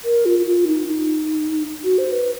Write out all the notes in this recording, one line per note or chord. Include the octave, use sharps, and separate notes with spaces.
A#4
F4
F4
D#4
D#4
F#4
C5
B4